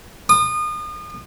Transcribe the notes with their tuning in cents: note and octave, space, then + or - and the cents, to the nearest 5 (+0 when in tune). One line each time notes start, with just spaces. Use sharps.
D#6 -35